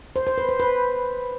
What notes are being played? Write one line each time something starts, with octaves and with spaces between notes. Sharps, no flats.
C5
C5
B4
C5
B4